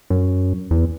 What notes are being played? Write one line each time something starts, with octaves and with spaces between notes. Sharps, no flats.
F#2
E2